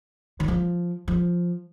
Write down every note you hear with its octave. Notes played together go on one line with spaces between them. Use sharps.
D#3
F3
F3